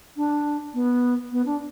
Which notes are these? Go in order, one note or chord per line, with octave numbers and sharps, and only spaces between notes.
D4
B3
B3
D4